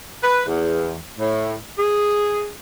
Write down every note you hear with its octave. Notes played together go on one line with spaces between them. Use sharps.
B4
E2
A2
G#4